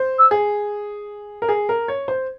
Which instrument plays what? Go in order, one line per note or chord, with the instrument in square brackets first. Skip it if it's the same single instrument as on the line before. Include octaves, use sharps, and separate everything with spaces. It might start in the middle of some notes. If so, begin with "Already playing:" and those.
Already playing: [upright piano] C5
[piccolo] E6
[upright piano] G#4
A#4
G#4
A#4
C#5
C5